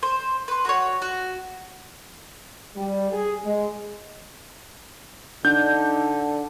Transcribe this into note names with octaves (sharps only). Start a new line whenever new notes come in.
C5
B4 C6
F#4 A4 C#5
F#4
G3
G#4
G#3
D3 D4 D#4 G6